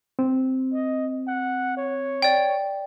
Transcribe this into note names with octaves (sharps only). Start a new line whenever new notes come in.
C4
D#5
F#5
C#5
D5 G5